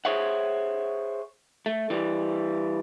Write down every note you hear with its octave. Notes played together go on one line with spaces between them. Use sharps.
G#4 C5 C#5 E5 F#5
A3
E3 G3